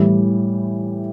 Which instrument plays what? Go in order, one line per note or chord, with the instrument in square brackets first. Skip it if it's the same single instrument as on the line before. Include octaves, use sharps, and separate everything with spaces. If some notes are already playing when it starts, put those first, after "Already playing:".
Already playing: [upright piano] A2 E3 G3